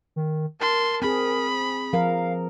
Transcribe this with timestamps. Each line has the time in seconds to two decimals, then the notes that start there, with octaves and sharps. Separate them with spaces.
0.16 D#3
0.60 A#4 A5 C6
1.02 C4 G#4 B5
1.93 F3 A#4 F5